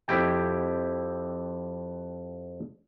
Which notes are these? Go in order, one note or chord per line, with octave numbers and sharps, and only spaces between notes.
F2 E4 G4 G5